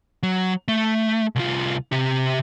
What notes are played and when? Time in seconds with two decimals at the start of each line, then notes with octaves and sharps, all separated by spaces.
0.23 F#3
0.68 A3
1.36 C2 F4
1.92 C3 G4